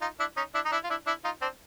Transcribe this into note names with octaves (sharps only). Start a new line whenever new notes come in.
D#4 F4
D4 E4
C#4 D#4
D4 E4
D#4
D4 E4
F4
D4 E4
D4 E4
D#4 F4
C4 D4